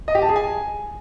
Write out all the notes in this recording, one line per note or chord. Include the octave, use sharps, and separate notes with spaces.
D#5
G4
A5
G#4
G#5